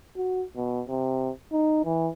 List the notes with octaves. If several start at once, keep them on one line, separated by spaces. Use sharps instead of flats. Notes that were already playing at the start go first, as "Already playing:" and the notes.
F#4
B2
C3
D#4
E3